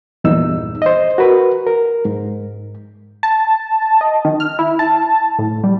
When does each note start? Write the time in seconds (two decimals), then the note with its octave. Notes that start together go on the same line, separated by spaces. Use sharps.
0.24 E2 G2 A#2 D#4 E6
0.82 C5 D#5
1.18 F#4 A#4 B4
1.67 A#4
2.05 G#2
3.23 A5
4.01 D#5
4.25 D#3
4.40 F6
4.59 E4
4.79 A5
5.39 A2
5.64 G3